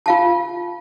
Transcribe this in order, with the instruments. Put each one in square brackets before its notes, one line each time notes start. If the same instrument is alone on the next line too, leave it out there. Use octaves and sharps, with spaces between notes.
[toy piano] F4 F5 A5